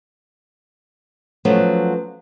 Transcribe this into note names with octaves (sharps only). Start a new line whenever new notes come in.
F3 F#3 A3 B3 C#4